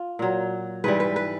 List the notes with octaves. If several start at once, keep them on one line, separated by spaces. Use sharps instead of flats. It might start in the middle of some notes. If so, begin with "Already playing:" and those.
Already playing: F4
A#2 F#3
G#2 E3 G3 B4
B4
B4